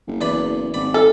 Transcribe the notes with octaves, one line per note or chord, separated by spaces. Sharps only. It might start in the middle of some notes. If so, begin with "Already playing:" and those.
F#1
E2 D5 B5
G#1 D5 B5
A4